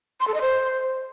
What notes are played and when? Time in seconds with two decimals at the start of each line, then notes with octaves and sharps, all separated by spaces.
0.20 C6
0.27 A4
0.34 D#5
0.41 C5